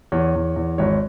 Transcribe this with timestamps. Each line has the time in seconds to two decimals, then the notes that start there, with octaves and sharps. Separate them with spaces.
0.12 E2 C#5
0.35 E2
0.56 E2
0.78 G#1 C#5